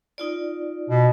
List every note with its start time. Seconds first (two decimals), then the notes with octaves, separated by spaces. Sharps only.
0.18 D#4 F4 D5
0.89 B2